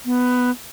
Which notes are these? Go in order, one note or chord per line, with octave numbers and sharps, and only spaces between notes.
B3